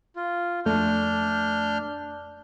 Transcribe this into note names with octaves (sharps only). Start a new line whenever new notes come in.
F4
F2 A3 D4 F6 G6